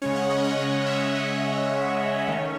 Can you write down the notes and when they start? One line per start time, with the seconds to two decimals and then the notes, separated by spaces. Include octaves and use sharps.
0.02 C#3 G#3 C#4 C#5
0.16 F#5
0.30 D#5
0.44 C#5
0.58 C#3 G#3 C#4 D#5
0.80 D#5
0.86 E5
1.15 C#3 G#3 C#4 D#5
1.72 C#3 G#3 C#4
2.28 D#3 A3 C#4 C#5